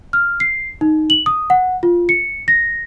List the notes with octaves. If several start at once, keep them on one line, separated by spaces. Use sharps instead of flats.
F6
C7
D#4
F#7
D#6
F#5
F4
C#7
A#6